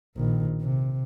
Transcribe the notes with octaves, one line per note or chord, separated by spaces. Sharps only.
A#1 D#3
C3